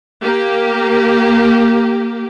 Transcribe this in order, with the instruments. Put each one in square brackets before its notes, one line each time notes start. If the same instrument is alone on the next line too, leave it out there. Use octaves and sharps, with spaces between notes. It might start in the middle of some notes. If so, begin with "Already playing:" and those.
[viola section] A#3 G4